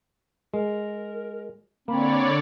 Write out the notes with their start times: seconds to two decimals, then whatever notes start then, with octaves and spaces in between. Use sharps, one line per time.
0.54 G#3 A#4
1.88 D3 A#3 C4 C#5 D5 B5